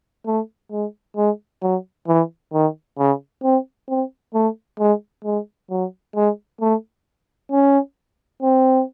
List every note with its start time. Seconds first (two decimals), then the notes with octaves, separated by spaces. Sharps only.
0.26 A3
0.71 G#3
1.16 G#3
1.62 F#3
2.07 E3
2.53 D#3
2.98 C#3
3.43 C4
3.88 C4
4.34 A3
4.79 G#3
5.24 G#3
5.70 F#3
6.15 G#3
6.61 A3
7.52 C#4
8.42 C4